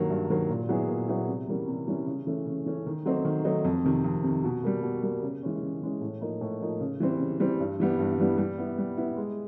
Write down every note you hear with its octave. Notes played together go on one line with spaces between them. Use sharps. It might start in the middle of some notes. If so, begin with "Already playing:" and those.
Already playing: G2 D#3 F#3 A#3
G2
D#3 F#3 A#3
A#2
F#3 B3 E4 G#4
A#2
F#3 B3 E4 G#4
C3
E3 G3 A#3 C#4
C3
E3 G3 A#3 C#4
C#3
E3 A3 C#4
C#3
E3 A3 C#4
D#3
F#3 A3 C4 D#4
D#3
F#3 A3 C4 D#4
F2
C3 D#3
F2
C3 D#3
B2
G3 A#3
B2
G3 A#3
C#3
E3 G#3 C#4
C#3
E3 G#3 C#4
A2
F3 A#3 D#4
A2
F3 A#3 D#4
C#3
E3 G3 C4
C#3
E3 G3 C4
G2
E3 G3 B3
G2
E3 G3 B3
G3
B3 E4
G3
B3 E4
G#3